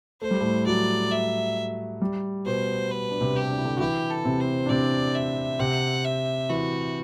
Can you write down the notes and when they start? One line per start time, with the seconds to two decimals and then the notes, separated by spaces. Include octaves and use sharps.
0.21 A3 C5
0.31 G3
0.40 A2 A3
0.66 F#3 D5
1.11 E5
2.01 G3
2.46 B2 B3 C5
2.91 B4
3.11 D4
3.20 C3 C4
3.36 G4
3.50 D4
3.58 E4
3.64 D3 D4
3.77 F#4
3.80 E3 E4 G4
4.10 A4
4.25 C3 C4
4.40 C5
4.66 D4
4.70 C3 C4 D5
5.15 E5
5.59 C3 C4 F#5
6.05 E5
6.49 E3 E4 F#4